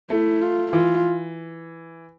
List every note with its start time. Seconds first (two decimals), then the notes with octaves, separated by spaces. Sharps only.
0.10 A3 E4
0.41 F4
0.72 E3 F4